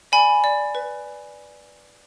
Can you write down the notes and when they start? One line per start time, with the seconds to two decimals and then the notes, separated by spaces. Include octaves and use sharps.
0.12 D5 G#5 B5
0.44 D5
0.75 B4